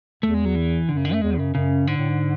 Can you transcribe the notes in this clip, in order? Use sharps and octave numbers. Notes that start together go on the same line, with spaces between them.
E2 A3
G#3
F#3
E3
F#2 D3
C#3
D3
A3
E2 G#3
F#2 C#3
F#2 C#3
G#2 D3
A2
G#2